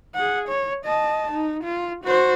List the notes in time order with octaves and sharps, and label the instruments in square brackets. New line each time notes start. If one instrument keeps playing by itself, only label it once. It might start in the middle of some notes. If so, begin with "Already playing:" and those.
[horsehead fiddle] G#4 F#5
C#5
D#5 A5
D#4
F4
F#4 C5